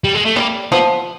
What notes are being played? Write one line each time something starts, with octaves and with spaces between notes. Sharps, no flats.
G3
G#3
A3
G3 A#3
F3 B3